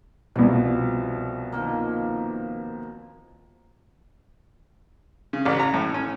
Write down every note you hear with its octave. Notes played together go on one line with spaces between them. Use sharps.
C2 B2 F3
D#3 F3 A#3
C#3
A1
A#5
A2
C#4